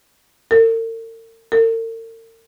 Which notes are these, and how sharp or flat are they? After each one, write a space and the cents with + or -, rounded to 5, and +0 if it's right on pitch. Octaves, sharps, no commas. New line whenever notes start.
A#4 -45
A#4 -45